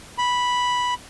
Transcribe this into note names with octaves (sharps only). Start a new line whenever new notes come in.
B5